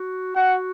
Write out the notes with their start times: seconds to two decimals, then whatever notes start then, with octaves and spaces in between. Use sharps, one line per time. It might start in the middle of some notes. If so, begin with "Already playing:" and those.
Already playing: F#4
0.35 F#4 F#5